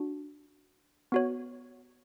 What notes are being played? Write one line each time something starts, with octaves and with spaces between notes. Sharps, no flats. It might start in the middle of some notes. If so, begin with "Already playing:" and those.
Already playing: D4 F#4
B3 F#4 C#5